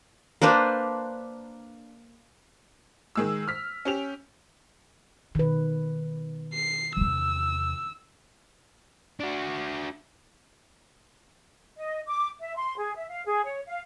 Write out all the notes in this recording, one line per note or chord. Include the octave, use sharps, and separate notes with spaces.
A#3 D4 B4 C5
D#3 G#3 E6
F6 B6
C#4 G4 F7
B2 D#3 B4
C7
E2 C3 E6
D4 F#4
D#5
D6
E5
C6
G#4
E5
F5
G#4
C#5
F5